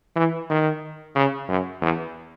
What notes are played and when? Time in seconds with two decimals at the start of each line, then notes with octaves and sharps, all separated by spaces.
0.16 E3
0.50 D#3
1.15 C#3
1.49 F#2
1.82 E2